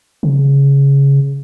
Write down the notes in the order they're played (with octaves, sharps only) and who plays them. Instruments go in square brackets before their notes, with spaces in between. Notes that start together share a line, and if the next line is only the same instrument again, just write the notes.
[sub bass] C#3